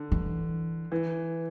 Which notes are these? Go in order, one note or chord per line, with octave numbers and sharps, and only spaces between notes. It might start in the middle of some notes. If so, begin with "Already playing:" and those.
Already playing: D3
E3
E3